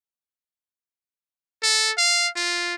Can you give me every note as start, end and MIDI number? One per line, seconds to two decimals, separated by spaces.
1.63 1.91 69
1.98 2.28 77
2.36 2.75 65